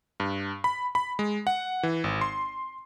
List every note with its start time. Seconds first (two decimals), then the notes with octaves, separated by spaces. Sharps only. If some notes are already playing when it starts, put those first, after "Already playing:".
0.20 G2
0.64 B5
0.95 B5
1.19 G#3
1.47 F#5
1.83 E3
2.04 G#1
2.21 C6